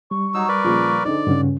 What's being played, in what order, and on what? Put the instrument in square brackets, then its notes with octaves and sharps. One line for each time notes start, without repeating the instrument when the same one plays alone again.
[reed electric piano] G3 [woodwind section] C#6
[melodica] F#3 D#4 E6
A#4 B4 D5
[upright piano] A#2 C#3 F3
[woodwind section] G#2 [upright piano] D3 D#4 [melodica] D5
[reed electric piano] G2 C#3 C#4 [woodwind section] F4 F#4